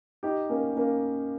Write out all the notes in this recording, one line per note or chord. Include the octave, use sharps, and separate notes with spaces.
D#4 G4
A#3 C#4
A#3 C#4